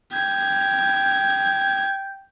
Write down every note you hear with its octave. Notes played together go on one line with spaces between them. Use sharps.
G5 G#6